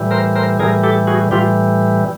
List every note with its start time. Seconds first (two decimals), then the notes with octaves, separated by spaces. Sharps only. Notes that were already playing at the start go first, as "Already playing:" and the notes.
Already playing: A2 E3 G3
0.11 A#4 C5
0.35 A#4 C5
0.59 A2 E3 G3 G#4 A#4
0.83 G4 A4
1.07 F#4 G#4
1.31 A2 E3 G3 F4 G4